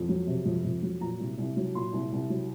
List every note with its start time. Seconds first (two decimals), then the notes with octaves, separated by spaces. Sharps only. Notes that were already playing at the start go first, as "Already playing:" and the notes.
Already playing: F2
0.09 F#3
0.27 C3
0.45 F2
0.64 F2
0.83 F#3
1.01 A#2 A#5
1.20 C2
1.38 C2
1.57 F#3
1.75 A#2 C6
1.93 C2
2.12 C2
2.30 F#3